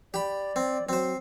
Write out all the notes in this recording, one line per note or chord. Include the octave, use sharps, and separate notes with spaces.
G4 D5 B5
C4
F#3 C4 C5